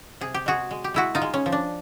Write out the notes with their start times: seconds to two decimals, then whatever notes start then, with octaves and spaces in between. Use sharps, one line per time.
0.21 C3 G#4
0.34 G4
0.46 G#3 F#4 G#4
0.71 G#3
0.84 G4
0.94 G#3 E4 F#4
1.15 D#4 F4
1.22 G#3
1.34 C#4
1.46 F3
1.52 D4